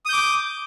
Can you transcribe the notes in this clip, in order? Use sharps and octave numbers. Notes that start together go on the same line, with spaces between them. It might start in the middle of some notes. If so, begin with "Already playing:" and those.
D6 D#6 G6